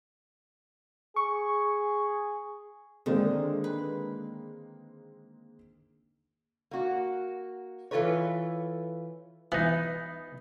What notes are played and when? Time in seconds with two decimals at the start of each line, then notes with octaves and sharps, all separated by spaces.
1.16 G#4 C#6
3.06 D3 D#3 G#3 A#3 C4
3.64 B4
6.71 A#3 F#4
7.91 E3 F4 A4 B4 C#5
9.52 E3 B3 D#4